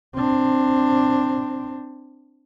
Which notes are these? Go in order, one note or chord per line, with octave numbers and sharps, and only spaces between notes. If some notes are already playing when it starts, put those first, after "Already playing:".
C4 D4